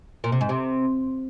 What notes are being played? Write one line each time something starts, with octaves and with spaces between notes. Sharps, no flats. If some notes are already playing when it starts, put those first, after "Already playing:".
A#2
C3
G#2
C3